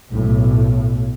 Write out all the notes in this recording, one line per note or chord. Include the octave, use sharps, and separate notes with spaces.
B1 A2